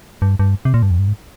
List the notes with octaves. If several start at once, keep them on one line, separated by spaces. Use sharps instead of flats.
G2
G2
C3
A#2
G2
F2
G2
G#2